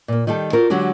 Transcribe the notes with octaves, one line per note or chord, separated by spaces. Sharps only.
A#2 A#3
D#3 G3 G4 A4
F4 F#4 A4 A#4 C5 D5
D3 F#3 G#3 F#4 G4